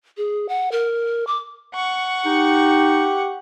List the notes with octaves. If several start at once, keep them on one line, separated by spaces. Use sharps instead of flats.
G#4
F#5
A#4
D6
F#5 C#6
D#4 G4